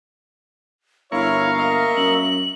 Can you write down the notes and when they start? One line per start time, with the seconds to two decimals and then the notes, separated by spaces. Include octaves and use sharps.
1.12 G1 E4 A#4 C#5 F5 C#6
1.58 A#3 D#5 E5
1.97 F#2 F#7